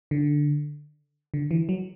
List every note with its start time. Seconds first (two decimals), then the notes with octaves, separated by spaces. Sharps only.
0.11 D3
1.34 D3
1.51 E3
1.69 F#3